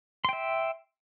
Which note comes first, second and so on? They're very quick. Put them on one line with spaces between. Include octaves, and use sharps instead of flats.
C6 G5 E5